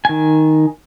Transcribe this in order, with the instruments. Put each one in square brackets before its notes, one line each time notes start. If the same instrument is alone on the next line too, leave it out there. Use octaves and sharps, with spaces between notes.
[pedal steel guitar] D#3 G#5